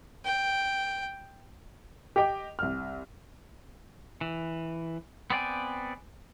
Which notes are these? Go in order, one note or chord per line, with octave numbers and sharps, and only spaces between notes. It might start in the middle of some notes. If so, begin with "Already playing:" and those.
G5
G4 D#5 G5 D6
C2 F6
E3
B3 C4 D5 G5 G#5